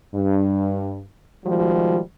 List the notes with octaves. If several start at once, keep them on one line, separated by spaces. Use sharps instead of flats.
G2
B2 D#3 F3 G3 G#3 F#4